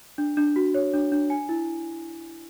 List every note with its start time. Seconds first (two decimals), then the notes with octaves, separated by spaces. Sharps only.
0.18 D4
0.37 D4
0.56 F#4
0.74 C#5
0.93 D4
1.12 D4
1.30 G#5
1.49 E4